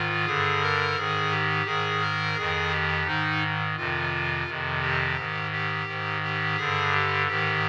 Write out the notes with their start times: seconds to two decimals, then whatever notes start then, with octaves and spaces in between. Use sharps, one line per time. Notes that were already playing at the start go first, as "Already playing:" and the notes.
Already playing: G#2 D#3 F4
0.25 G2 D3 G#4
0.61 A#4
0.96 G#2 D#3 G#4
1.31 G4
1.66 G#2 D#3 G#4
2.01 A#4
2.36 F2 D#3 G#4
2.71 G4
3.06 G#2 D#3 D#4
3.76 F2 C3 D#3 F4
4.47 F2 C3 D#3
4.81 G4
5.16 G#2 D#3
5.51 G4
5.86 G#2 D#3
6.22 G4
6.56 G2 D3 G#4
6.93 G4
7.27 G#2 D#3 G4